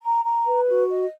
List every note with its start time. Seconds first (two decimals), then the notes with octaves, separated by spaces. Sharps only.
0.03 A#5
0.24 A#5
0.46 B4
0.69 F#4
0.89 D#5